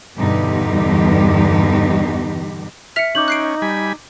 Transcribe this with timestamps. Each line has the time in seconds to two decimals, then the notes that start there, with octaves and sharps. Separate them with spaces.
0.17 E2 G2 B2 D3 D#4 G4
2.96 E5 F6 B6 C#7 F7
3.15 C#4 D#4 D6 G6 F#7
3.28 F#6 C7 D7
3.62 G3 G#5 B5